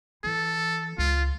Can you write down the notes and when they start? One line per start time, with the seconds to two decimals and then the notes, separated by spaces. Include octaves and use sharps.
0.24 E3 A4
0.98 C#2 F4